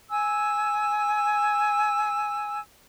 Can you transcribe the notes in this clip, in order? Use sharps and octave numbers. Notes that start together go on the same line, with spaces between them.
G#5 E6